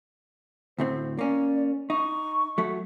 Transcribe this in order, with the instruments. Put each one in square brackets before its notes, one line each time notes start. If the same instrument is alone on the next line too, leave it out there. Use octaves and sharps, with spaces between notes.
[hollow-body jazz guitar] D2 A2 C4 [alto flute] C5
[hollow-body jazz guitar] A#3 C#4 [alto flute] D5
[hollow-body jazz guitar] D#4 [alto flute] C#6
[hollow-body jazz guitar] F#3 A3